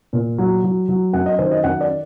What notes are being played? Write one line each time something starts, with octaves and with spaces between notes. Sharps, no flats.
A#2
F#3
F#3
F#3
F#2 F#5
D#5
D#3 C5
D#5
F#2 F#5
D5